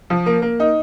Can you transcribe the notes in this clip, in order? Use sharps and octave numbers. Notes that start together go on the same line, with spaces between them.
F3
A#3
A#3
D#4